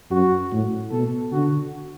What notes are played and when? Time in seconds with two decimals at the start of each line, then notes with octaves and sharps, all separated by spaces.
0.11 F#2 F#4
0.52 A2
0.91 B2 A4
1.32 D3 F#4